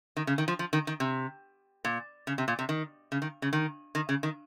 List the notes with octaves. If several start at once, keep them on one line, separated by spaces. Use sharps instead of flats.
D#3
C#3
D#3
F3
F3
D#3
D#3
C3
A#2
C#3
C3
A#2
C3
D#3
C#3
D#3
C#3
D#3
D#3
C#3
D#3